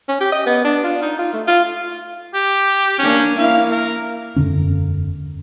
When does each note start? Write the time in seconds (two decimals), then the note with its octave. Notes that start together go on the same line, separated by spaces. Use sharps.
0.08 C#4
0.20 G4
0.32 D#5
0.46 B3
0.65 D4
0.84 F4
1.02 D#4
1.19 F4
1.33 A3
1.48 F4
2.34 G4
2.99 A#3 C#4 D4
3.38 A#3 E4 F5
3.71 A#4
4.36 E1 F#2 D3 C#4